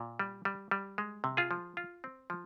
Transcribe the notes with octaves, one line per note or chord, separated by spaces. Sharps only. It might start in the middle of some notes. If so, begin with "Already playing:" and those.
Already playing: A#2
G3
G3
G3
G#3
C3
F4 G#4
F3
F4
C4
F3